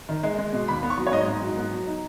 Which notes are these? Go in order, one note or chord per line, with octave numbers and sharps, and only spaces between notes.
D#3
G#3
G#3
B2
D#2 B5
B3
C#6
F#3
C#5
G#2 D#5
G#2
F#3
B3
F#3
D#4